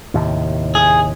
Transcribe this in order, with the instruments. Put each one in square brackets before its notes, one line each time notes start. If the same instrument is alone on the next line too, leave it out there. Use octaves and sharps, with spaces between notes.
[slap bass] D#2 A2 C3
[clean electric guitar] G#4